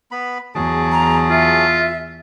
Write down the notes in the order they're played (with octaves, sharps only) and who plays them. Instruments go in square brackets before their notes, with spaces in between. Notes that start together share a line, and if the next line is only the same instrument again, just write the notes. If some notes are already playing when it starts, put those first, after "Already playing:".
[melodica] B3 B5
[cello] E2 [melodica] F#3 G#4 A5
[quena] A#5
[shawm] F4 [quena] E5